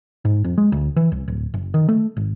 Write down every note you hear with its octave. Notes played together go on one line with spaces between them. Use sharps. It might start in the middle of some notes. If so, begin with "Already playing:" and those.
G#2
F2
G#3
D2
E3
C2
D1
F#1
D#3
A3
G#1